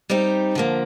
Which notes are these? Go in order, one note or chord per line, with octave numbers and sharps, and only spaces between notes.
G3 C4 D#4 G4
D3 F3 A#3